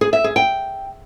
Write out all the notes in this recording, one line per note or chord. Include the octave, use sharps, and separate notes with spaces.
G#4
E5
G#4
G5